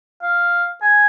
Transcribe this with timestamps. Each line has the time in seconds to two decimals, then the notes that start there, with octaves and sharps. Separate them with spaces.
0.22 F5
0.82 G#5